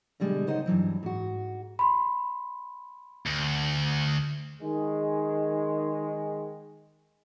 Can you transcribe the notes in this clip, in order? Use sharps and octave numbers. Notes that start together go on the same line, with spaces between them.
B2 D3 G3 G#3
C#3 D#4 C5 D#5 F#5
G2 C3 E3 F#3
G#2 F#4
B5 C6
D2
D#3 G#3